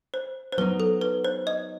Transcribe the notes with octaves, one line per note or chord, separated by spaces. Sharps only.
C5
C5
F#3 B3 D#4 B4
A4
B4
C5
D#5